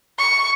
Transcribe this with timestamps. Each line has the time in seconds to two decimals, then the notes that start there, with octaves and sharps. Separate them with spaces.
0.18 C#6